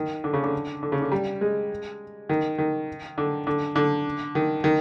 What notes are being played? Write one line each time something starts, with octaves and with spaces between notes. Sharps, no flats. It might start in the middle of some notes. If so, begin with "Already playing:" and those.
Already playing: D#3
D3
C#3
D3
D3
C#3
D3
G3
G#3
D#3
D#3
D3
D3
D3
D#3
D#3